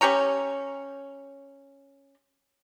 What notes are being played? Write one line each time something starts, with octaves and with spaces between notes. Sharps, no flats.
C#4 G4 C#5 A#5